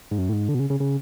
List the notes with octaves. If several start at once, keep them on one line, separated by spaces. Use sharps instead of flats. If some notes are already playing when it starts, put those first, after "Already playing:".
G#2
F#2
A2
G#2
D3
B2
C#3
C#3
C#3